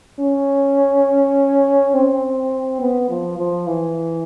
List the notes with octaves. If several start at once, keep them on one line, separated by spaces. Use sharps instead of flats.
C#4
C4
B3
F3
F3
E3